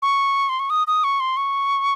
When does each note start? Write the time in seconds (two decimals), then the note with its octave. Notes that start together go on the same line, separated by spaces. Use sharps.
0.02 C#6
0.49 C6
0.60 C#6
0.70 D#6
0.87 D#6
1.04 C#6
1.20 C6
1.37 C#6